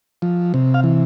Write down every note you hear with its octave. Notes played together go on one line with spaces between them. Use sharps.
F3
C3
F5
E3